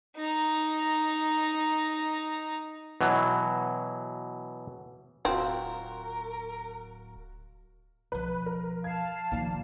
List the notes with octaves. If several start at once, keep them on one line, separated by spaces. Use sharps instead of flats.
D#4 A#5
B2 E3 F#3
D1 C4 F4 F#4 A#4
B1 F3 B4
A#4
F5 A5 G#6
A#2 D#3 F3